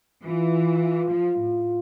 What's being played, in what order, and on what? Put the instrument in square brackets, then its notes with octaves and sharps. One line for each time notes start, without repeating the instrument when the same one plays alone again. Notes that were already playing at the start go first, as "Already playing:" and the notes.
[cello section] E3 [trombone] F4
[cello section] F3
A2